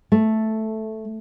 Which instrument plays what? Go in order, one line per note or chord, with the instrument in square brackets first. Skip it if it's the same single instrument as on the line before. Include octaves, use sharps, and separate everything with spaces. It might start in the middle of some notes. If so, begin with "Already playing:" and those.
[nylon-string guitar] A3